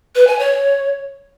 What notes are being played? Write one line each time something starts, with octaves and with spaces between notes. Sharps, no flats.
B4
G#5
C#5